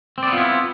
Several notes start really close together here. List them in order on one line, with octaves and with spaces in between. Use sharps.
C4 D5 B3 F4 E4